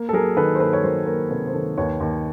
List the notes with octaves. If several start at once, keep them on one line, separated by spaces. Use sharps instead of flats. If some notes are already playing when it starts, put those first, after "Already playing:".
Already playing: A#3
A4
F#3 G#4 A#4
D#3 A4 B4
C5
A#3 A4 B4
C#5
F#3 A#4 C5
A#3 A#4 C5
C3 A4 B4
C5
D#3 A4 B4
D#2 B4 C#5
D#2